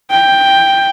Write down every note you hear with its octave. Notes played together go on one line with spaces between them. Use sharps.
G5